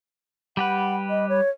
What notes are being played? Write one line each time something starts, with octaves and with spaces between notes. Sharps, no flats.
G3 G4 B4 F#5
D#5
C#5